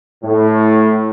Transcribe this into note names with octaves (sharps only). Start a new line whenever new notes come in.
A2